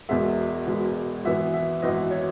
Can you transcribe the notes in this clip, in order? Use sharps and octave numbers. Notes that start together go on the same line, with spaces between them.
E1 E2 B2 G#3 E5
E1 E2 B2 G#3
G#1 F#2 E3 B3 E5
E5
G#1 F#2 E3 B3 D#5
C#5